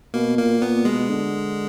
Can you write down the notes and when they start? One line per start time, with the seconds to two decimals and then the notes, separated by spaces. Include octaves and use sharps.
0.14 B2 A#3
0.38 A#2 A#3
0.61 A#2 B3
0.85 B2 G#3
1.10 D3